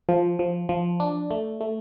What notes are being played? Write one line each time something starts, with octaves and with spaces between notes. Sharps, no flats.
F3
F3
F3
D4
A3
A3